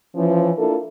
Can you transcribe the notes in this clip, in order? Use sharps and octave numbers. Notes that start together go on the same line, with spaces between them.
E3 F3 C#4
A#3 D4 E4 F4 A4 A#4